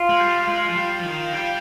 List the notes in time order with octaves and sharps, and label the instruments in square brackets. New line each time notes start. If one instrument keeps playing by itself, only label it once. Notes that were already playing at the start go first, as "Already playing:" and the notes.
Already playing: [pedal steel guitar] F4
[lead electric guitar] G#3
G3
G#3
F3
G3
F3
D#3
G3